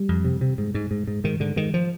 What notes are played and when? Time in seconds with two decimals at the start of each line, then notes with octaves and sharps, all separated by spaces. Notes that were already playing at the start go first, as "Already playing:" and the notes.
Already playing: G3
0.09 F2
0.24 C3
0.41 C3
0.58 G#2
0.74 G#2
0.91 G#2
1.07 G#2
1.24 G#2 D#3
1.40 G#2 D3
1.56 G#2 D#3
1.74 F3